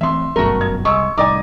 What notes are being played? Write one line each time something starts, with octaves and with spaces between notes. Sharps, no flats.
E3 A3 C4 E5 C6
G1 F#2 B2 A3 F#4 A#4
G#6
C2 G#3 C#6 E6
C2 A2 D#4 D5 G#5 D6